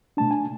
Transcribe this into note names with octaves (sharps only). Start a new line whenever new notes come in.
B2 A3 D4 A5
G#5